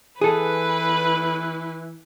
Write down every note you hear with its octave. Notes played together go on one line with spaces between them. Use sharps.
E3 G#4 A4 B4